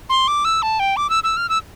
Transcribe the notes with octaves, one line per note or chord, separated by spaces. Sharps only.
C6
D6
E6
A5
G5
D6
E6
E6
F6
E6